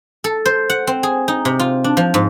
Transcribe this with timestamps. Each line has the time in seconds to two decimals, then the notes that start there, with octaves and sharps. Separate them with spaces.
0.24 A4
0.45 C5
0.70 F#5
0.87 C4
1.03 G#4
1.28 D#4
1.45 C3
1.59 F4
1.84 D4
1.97 F3
2.14 G#2